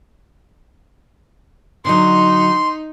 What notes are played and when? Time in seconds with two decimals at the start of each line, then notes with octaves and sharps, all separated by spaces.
1.85 D3 F#3 D#4 C6